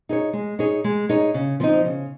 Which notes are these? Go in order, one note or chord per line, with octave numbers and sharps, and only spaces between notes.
D#4 G#4 C#5
G#3
D#4 G#4 C#5
G#3
D#4 G#4 C#5
C#3
F3 C4 D#4
C#3